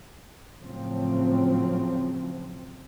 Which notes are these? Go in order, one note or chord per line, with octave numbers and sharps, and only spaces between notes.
A2 C#3 F3 F#3 C4